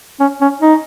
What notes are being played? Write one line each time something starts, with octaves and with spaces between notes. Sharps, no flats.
C#4
C#4
D#4